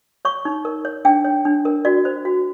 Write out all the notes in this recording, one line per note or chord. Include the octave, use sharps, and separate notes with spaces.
C#5 C#6
D#4
A#4
C#5
D4 G5
C#5
D4
A#4
F#4 D5
C5
F#4